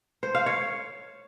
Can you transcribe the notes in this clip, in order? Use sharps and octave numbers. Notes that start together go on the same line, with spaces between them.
C5
F5
C#5